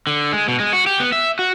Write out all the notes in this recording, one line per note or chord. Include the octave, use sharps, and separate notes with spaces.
D3
G#3
B2
G#3
F#4
G4
B3
E5
F#4